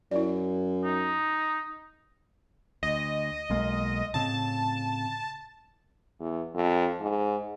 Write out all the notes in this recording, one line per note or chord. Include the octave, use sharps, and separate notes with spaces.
F#2 E4 D5
D#4
D2 D#5
B1 G#3 A#3
A2 C#3 C4 A5
E2
F2
G#2